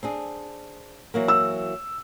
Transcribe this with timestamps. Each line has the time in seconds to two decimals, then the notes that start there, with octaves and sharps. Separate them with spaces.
0.03 C4 D4 G#4
1.14 E3 F#3 A#3
1.28 E6